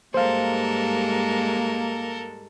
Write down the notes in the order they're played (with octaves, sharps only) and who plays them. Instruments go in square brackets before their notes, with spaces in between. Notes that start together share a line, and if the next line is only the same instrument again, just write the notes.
[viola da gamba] G#2 G3 G#3 [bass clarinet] A#3 [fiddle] A4 A#4 [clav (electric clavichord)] C5 F5